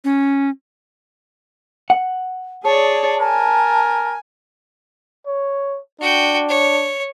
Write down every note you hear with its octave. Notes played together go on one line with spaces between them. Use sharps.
C#4
F#5
G#4 C#5 D5 A5
A#4 G#5 A5
C#5
D4 F#4 G5
C#5